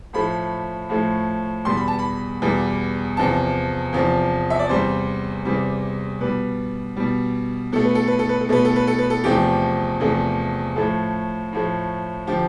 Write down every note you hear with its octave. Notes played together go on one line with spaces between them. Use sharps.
A2 F3 A3 B5
A2 F3 A3
E2 B2 G3 C6
B5
A5
B5
E2 B2 G3
E2 C3 F3 A5
E2 C3 F3
E5
D5
E2 C3 G3 C5
E2 C3 G3
B2 G3 B4
B2 G3
B2 A3 A4
B4
A4
B4
A4
B4
A4
B2 A3 B4
A4
B4
A4
B4
A4
E2 C3 F3 A3 G4
E2 C3 F3 A3
A2 F3 A3 A4
A2 F3 A3
D3 F3 G4